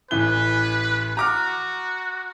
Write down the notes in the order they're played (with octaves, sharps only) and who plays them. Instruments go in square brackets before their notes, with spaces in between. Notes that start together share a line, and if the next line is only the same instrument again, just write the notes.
[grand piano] A1 E3 G7 [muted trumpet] B4
[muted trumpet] F#4 [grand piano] A#5 D6 F6